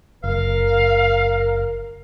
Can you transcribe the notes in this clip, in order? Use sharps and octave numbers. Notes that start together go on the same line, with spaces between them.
F#1 A#4 F5